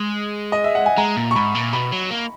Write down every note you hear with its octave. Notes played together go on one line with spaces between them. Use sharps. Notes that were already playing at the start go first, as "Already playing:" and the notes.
Already playing: G#3
D#5
E5
F#5
G#5
G#3 A#5
A#2
C#6
G#2 B5
A#2
B2 B5
F#3
A#3